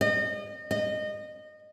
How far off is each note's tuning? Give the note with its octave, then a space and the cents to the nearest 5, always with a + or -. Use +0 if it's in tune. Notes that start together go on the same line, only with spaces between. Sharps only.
D#5 -35
D#5 -25